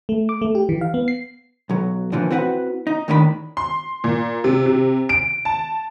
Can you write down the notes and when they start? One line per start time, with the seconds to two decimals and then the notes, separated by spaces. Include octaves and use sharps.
0.09 A3
0.29 D6
0.42 A3
0.55 G4
0.69 E3
0.81 F5
0.94 B3
1.08 C7
1.69 B1 F#3
2.12 A#2 D3 E3 F3
2.31 C4 E4 F#4 B4 E5 F#5
2.87 D#4
3.08 D#2 A2 D#3 D4 A#4 B5
3.57 C6
4.04 A#2
4.44 C3
4.66 C3
5.09 D7
5.45 A5